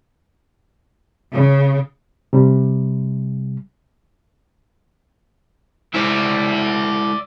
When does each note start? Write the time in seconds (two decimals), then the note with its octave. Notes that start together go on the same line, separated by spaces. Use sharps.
1.33 C#3
2.33 C3 G3
5.94 G#3 E4 C5 D5 E5